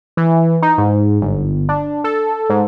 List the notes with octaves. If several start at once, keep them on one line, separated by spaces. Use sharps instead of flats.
E3
D#4
G#2
G1
D4
A4
G#2